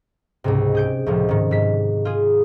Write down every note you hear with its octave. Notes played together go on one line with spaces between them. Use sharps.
C#2 G#2 C3
G#4 G6 D7
C#2 A2 C3 F3
G#2 D#3
G#2 B6
F4 G#4